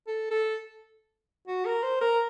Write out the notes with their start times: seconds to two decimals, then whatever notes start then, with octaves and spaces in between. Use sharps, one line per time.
0.07 A4
0.31 A4
1.47 F#4
1.65 A#4
1.83 C5
2.01 A#4